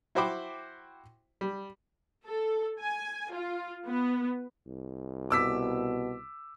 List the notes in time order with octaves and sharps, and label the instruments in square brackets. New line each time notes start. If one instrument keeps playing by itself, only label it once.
[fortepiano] E4 F#4 C5 G5 B5 D6
G3
[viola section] A4
G#5
F4
B3
[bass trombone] C2
[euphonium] B2 [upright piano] D6 E6 B6